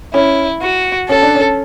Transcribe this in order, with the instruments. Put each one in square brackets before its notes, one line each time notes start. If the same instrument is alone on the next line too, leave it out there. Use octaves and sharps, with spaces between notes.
[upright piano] C#4 [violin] E4
[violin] F#4
[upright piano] C#4 [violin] A4
[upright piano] D4
C#4